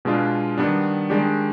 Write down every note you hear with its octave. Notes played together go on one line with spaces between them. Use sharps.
B2 G#3 D4 F4
D#3 G3 B3 D4
D#3 G#3 D4 G4